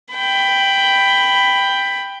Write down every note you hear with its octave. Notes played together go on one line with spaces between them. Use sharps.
G5 B5